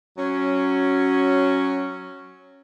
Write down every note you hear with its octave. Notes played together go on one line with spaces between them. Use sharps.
F#3 C#4